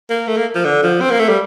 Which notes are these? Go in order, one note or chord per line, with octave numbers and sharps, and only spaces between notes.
A#3
A3
A#3
F3
D3
F3
C4
A#3
A3
G3